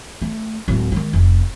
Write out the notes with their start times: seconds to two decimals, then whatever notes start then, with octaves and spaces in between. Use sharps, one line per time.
0.22 A3
0.68 D1 G#3
0.92 D#3 G#3
1.13 F1